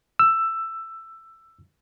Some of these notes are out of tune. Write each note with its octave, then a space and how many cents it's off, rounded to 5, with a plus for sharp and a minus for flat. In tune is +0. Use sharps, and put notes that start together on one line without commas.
E6 +10